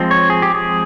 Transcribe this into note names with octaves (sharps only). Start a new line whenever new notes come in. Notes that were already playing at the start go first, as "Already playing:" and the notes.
Already playing: F3 G#3 C4
C#5
G#4
G4
G#4